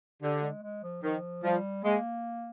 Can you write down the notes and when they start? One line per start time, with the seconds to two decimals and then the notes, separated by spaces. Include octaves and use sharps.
0.22 D3 G4
0.43 G#3
0.63 G#3
0.83 F3
1.03 D#3 F3
1.43 F3 G3
1.84 G#3 A#3